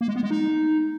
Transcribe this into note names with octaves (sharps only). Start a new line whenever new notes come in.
A#3
G#3
B3
G#3
D#4